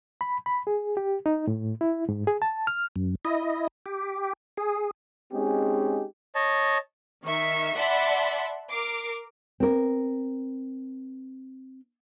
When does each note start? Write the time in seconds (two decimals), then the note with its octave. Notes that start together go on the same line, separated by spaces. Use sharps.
0.21 B5
0.46 B5
0.67 G#4
0.97 G4
1.26 D#4
1.47 A2
1.81 E4
2.09 G#2
2.27 G#4
2.42 A5
2.67 F6
2.96 F#2
3.25 E4 D#5
3.86 G4
4.57 G#4
5.32 G#3 C4 C#4 D#4 G4 G#4
6.35 C#5 D#5 A5
7.25 D#3 E5 C#6
7.77 D5 E5 F#5 A5 B5 C6
8.71 A#4 D6 C7
9.60 C4 A#4